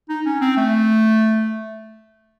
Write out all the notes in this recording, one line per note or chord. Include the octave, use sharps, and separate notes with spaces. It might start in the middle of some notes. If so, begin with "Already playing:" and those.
D#4
C#4
C4
A3